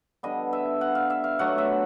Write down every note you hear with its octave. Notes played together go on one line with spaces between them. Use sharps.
D3 G3 B3 D#5
E5
F#5
F5
E5
F5
B2 F#3 A3 D4 F#5
E5